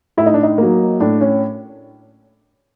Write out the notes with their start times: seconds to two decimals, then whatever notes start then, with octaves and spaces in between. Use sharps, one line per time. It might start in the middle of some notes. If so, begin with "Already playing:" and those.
0.17 A2 E4
0.26 D#4
0.34 D4
0.43 D#4
0.58 F#3 A#3
1.00 A2 D4
1.21 C#4